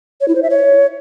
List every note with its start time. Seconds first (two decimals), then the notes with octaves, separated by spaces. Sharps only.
0.21 C#5
0.28 E4
0.35 C5
0.43 E5
0.50 C#5